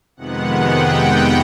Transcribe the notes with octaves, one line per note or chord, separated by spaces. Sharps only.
F2 C3 D#3 G#3 B3 F#5
G5